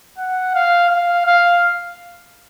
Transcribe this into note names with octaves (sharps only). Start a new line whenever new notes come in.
F#5
F5
F5
F5